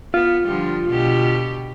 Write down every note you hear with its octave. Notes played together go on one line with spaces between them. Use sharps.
B3 F4
D3 F3 G3
B2 D3 G4